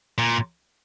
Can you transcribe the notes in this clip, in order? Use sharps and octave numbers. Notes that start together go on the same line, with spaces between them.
A#2